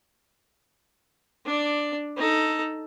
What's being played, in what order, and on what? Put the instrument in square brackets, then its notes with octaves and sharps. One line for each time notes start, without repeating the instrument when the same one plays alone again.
[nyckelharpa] D4 D5
D#4 A4